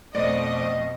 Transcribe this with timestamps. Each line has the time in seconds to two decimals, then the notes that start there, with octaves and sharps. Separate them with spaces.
0.15 F2 B2 A3 C5 D5 D#5